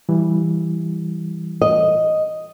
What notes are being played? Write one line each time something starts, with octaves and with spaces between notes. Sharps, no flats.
E3 G3
D#5